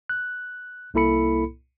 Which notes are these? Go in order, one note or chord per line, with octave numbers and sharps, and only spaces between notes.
F#6
C2 A#3 E4 A4 B5 C#7